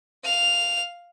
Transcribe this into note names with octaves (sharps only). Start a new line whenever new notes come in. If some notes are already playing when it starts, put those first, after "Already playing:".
F5 F7